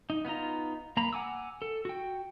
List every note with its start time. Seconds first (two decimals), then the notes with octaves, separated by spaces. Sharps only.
0.10 D#4
0.25 B3 D#4 F4 A#5
0.97 A#3 A#5 B5
1.13 F#5 G#5 D6 E6
1.62 A4
1.85 F#4 G5